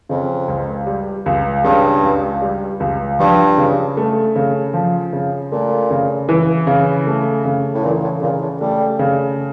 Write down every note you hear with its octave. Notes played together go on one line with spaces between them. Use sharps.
F2 C#3
C#2
G3
C#2
G2 C#3
C#2
G3
C#2
G2 F3
C#3
A3
C#3
F3
C#3
A#2 A3
C#3
E3
C#3
A3
C#3
A2
A#2 E3
A2
A#2 C#3
A2
G3 A3
C#3